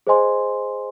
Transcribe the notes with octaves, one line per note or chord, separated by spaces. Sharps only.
G#4 C5 D#5 G#5 C6